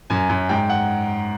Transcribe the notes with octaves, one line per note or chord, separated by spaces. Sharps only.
F#2 G#5
F#2
G#2 G5
F#5